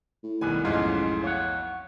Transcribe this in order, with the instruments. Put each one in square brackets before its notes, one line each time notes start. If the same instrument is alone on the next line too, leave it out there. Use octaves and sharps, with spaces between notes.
[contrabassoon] A2
[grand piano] B1 G#5 [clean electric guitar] D#3 G3 B3
[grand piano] B1 F2 D#5 [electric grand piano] G#2 [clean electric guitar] C#4 F4
[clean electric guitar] C#5 F#5 [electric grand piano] F5